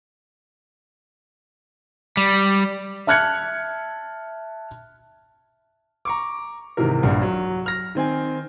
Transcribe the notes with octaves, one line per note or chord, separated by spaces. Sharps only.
G3
E5 A5 F6 F#6 G#6 C#7
A#5 C#6 D6
G#2 C3 D#3 E3 A#4
A#1 G2 F#5
F#3
F6 A#6
D#3 C4 G#5